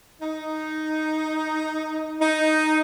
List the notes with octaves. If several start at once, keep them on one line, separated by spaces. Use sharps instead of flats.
D#4
D#4